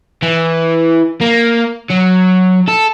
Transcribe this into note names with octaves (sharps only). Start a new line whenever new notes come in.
E3
A#3
F#3
A4